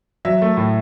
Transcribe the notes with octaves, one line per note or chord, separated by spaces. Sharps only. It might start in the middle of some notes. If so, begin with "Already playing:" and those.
F#3 E5
A3
A2